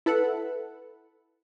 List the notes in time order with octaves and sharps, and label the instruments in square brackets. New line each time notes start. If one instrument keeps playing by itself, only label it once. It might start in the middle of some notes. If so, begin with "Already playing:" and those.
[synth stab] E4 A4 B4 E5 F#5